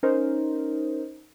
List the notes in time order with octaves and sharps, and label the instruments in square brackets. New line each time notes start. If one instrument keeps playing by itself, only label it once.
[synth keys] C#4 D#4 A#4 C5